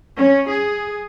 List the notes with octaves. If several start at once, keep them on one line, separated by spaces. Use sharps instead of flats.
C#4
G#4